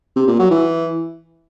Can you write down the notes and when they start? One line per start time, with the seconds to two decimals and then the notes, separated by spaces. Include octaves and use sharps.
0.16 C3
0.28 A#2
0.39 F#3
0.51 E3